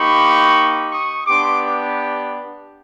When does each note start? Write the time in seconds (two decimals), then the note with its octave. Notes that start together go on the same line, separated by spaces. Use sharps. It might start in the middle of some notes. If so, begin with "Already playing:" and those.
Already playing: A#3 D#4 G4 B5 C#6
0.92 C#6 D#6
1.27 B3 D4 G4 C6 D6